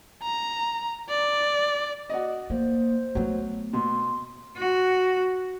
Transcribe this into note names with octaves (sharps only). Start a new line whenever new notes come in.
A#5
D5
F#4 D5 D#5
A#3 C5
F#3 A3 B3
B2 C6
F#4